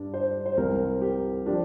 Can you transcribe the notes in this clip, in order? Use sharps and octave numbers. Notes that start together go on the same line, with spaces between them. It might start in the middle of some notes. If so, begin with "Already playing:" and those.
Already playing: G2 G3 D4 D5
C5
C5
C2 C3 G3 C4 A#4
G4
F3 D4 G4